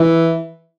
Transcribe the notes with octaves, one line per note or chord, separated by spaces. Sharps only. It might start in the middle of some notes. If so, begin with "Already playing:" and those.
Already playing: E3